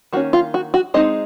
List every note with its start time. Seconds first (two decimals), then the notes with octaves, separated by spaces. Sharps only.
0.13 D#3 A#3 C#4 F#4
0.33 F4
0.54 F#4
0.74 F#4
0.94 G#3 C4 D#4 D#5